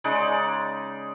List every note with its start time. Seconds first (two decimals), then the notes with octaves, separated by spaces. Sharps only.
0.04 C#3 G#3 D#4 D5